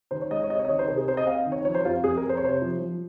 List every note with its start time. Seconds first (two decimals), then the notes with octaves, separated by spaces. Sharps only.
0.11 D#3 C5
0.21 C#5
0.31 G#3 D#5
0.44 C#5
0.49 C4 D#5
0.59 C#5
0.65 D#5
0.69 D#3 C#5
0.79 C5
0.88 C3 A#4
0.97 G#4
1.08 C4 C5
1.17 D#5
1.27 C4 F5
1.46 D#3
1.52 C#5
1.65 F3 C#5
1.75 C5
1.85 F2 F4
2.04 F2 G#4
2.17 A#4
2.24 F2
2.29 C5
2.37 C#5
2.43 C3 C5
2.62 F3
2.81 F3